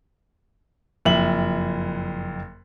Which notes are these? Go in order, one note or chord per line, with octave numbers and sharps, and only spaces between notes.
F#1 F2 E5 F#7